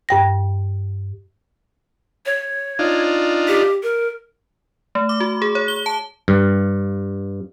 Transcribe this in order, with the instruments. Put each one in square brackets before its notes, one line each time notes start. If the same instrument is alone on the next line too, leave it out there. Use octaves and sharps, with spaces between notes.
[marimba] G2 G5 A#6
[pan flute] C#5
[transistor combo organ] D4 D#4 F4
[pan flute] G4
A#4
[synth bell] A3
D6
F#4
G#4
C#5
G7
A5
[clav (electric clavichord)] G2